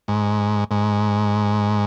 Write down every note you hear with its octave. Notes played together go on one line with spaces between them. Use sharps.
G#2
G#2